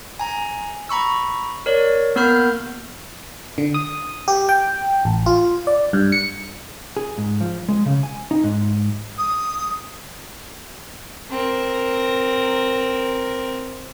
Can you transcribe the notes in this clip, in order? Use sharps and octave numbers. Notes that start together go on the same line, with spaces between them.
G#5 A#5
A#5 B5 C#6 E6
A#4 C#5 D5
A#3 B3 A#4 B5 F6 G6
D3
D#6
G4
G5
A1
F4
D5
G2
C#7
G#4
G#2
F3
G#3
C#3
G#5
D#4
G#2
D#6
C4 A#4